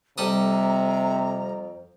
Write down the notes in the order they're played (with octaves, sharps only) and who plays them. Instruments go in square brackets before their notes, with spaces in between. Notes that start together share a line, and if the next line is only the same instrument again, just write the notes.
[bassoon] F2 [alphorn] C3 [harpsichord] G3 A4 D#6 [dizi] A#5